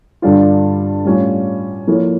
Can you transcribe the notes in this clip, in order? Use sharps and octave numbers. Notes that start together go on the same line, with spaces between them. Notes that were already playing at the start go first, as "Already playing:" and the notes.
G2 D3 G3 D4 F4
A2 G3 C#4 F4
F3 A#3 E4 A4 C#5